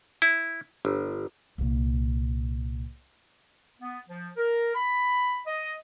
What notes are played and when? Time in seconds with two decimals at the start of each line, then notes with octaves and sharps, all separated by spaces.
0.22 E4
0.85 G1
1.58 C2 A#2
3.81 B3
4.09 F3
4.37 A#4
4.75 B5
5.46 D#5